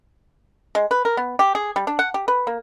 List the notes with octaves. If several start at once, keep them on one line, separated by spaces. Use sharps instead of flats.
G#3
B4
A#4
B3
G4
G#4
G3
D4
F#5
G4
B4
A#3